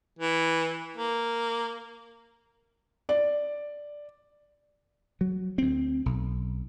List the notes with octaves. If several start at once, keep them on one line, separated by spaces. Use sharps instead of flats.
E3
A#3
D5
F#3
D2 C4
B1